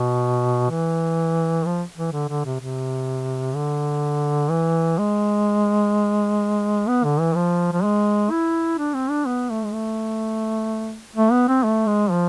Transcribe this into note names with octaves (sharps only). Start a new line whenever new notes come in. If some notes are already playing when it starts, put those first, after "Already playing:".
Already playing: B2
E3
F3
E3
D3
D3
C3
C3
D3
E3
G#3
B3
D3
E3
F3
F3
G#3
E4
D4
C4
D4
B3
A3
G#3
A3
A3
B3
C4
A3
G#3
F3